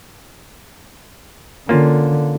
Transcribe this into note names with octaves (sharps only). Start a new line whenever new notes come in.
D3 A#3 C#4 F4